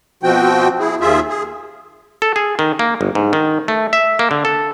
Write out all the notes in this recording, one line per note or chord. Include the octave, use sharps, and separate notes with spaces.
B2 F3 C4 F#4 G5
E4 G#4
D#2 F4 G#4 E5
G#4
A4
G#4
D#3
A#3
G1
G#2
D#3
A3
E5
A#3
D3
A4